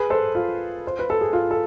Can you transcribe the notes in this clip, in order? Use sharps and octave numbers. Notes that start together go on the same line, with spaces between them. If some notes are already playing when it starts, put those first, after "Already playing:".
Already playing: G#4 B4
A4 C5
F4
C5
B4
A4
G#4
F4
A4